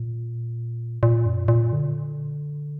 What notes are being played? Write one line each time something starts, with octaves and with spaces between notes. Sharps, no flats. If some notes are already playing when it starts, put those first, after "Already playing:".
Already playing: A#2
A#2
F#2
A#2
D3